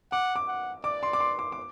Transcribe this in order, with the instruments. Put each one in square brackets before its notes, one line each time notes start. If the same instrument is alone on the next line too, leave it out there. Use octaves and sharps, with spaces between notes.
[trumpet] F#5 [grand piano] D6
[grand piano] D6
[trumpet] F#5
[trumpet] D5 [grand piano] D6
[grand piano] C6
D6
C6
D6
D6